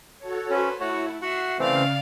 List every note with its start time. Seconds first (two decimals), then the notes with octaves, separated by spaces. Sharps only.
0.18 F#4 A4 C#5
0.50 C#4 B4 C5
0.80 A3 E4 F#4 C#5 F#5
1.22 F#4 E5 F#5 C7
1.59 C#3 E3 A3 C4 D5 F5 F6 C7